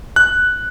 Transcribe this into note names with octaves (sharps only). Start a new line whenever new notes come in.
F#6